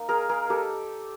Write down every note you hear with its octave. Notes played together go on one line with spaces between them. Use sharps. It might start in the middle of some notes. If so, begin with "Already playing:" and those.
Already playing: A#3 D#4
G#4 A#4
G#4 A#4
G4 A4